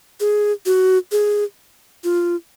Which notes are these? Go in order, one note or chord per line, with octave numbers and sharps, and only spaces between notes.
G#4
F#4
G#4
F4